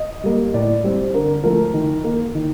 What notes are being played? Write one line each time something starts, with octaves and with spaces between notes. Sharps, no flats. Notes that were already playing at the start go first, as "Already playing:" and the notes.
Already playing: D#5
G3 A#3
A2 D5
G3 C4
D3 A#4
F3 A3 A#4
D#3
A#3
D#3